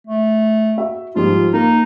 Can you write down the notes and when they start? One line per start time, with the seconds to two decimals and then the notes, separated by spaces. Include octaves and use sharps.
0.07 A3
0.77 F#4 E5
1.16 G#2 F3 G3 F4
1.53 A#3 D#4